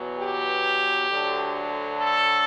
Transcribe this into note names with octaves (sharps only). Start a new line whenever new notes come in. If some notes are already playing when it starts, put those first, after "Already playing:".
Already playing: E2 B2 F#3
G4
D2 D3 F#3
A4